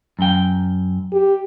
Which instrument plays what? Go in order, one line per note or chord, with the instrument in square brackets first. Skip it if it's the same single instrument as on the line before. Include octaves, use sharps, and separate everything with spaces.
[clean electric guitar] F#2 G5
[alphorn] G4